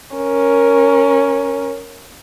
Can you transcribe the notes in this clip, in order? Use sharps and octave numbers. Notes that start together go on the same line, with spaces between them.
C#4 A#4